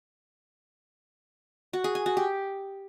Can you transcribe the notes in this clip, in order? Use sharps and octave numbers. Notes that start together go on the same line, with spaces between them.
F#4
G#4
G#5
F#4
G4